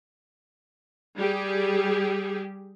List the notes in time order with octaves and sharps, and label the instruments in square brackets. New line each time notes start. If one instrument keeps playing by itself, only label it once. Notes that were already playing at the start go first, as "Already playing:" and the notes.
[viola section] G3 G4 G#4